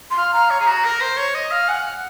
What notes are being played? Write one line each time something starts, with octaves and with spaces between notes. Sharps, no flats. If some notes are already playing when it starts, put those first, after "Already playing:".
C6
F5
F5 A#5
C#5
G#4
F#4
A#4
C5
C#5
D#5
F5
F#5 G#5